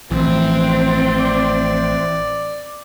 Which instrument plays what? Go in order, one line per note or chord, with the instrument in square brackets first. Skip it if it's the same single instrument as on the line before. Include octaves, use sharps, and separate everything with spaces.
[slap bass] A1 F3 [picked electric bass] E3 [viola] C4
[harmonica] D5